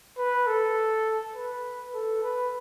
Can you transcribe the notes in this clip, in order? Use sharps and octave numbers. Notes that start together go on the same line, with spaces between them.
B4
A4
B4
A4
B4